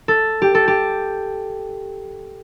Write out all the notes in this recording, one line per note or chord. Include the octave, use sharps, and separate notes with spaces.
A4
G4
A4
G4